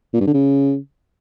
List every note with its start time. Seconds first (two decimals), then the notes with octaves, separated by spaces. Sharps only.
0.14 A#2
0.20 G2
0.27 D3
0.34 C#3